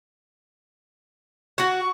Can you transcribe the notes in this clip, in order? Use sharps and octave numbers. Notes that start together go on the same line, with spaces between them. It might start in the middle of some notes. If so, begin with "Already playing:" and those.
F#4 F#5 C#6